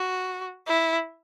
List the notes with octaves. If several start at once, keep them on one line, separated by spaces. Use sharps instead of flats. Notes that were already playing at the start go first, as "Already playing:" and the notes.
Already playing: F#4
E4